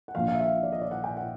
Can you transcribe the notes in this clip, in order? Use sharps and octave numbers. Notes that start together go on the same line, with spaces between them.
F#5
A#1 A#2 F3 F5
F5
E5
F5
D5
D#5
D5
F#5
G5
F#5